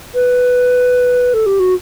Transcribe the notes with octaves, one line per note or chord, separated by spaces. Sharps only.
B4
A4
G4
F#4